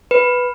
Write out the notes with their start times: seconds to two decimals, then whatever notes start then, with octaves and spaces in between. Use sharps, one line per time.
0.11 B4